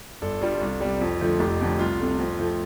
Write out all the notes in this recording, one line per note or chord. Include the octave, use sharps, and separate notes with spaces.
G1 A4 D5
G2 G3 F4 A4
C2
C3 G3
F2
D3 F3 A3
F1 G4
F2 D3 A3
C2 F4
C3 A3
F2
F3 A3